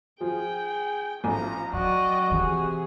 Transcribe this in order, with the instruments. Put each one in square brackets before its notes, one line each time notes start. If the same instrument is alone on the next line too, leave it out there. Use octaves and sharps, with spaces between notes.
[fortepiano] F3 [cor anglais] G#4 [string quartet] G5
[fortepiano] A1 G#5 [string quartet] F3 A#5
[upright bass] F#3 [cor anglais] F#4 [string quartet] D5 D#5 G5
[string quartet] C3 G#4 [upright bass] E3